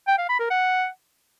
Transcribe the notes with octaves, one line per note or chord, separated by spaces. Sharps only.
G5
F5
B5
A#4
F#5